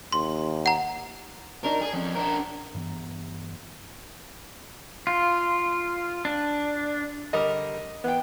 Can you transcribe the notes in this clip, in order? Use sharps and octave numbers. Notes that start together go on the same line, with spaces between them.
D#2 C6
F#5 A#5
F#3 D4 D#4 A#4
G#4
F2 C#4
D4 A#4
G2 E3 B3
F4
D4
D3 G3 A#4 D#5
E3 B3 G5